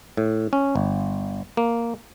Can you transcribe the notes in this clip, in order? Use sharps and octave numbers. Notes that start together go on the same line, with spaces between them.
A2
C#4
G1
A#3